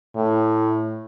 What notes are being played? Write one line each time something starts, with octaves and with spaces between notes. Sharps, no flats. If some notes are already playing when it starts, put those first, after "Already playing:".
A2